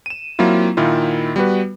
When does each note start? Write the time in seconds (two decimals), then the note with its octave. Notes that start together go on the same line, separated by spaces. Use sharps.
0.06 D#7 E7
0.39 F#3 A#3 C4 E4 F4
0.77 A#2 D#3 E4 F4
1.36 G3 B3 F#4 B4